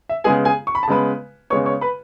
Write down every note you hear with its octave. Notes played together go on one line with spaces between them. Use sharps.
E5
C#3 G#3 B3 G#4 G#5
G#4 G#5
C#6
B5
A5
C#3 G#3 B3 B4 B5
C#3 G#3 B3 C#5 C#6
C#5 C#6
B4 B5